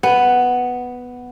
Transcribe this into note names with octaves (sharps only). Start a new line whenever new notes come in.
B3